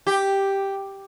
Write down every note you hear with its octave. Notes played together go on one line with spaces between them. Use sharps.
G4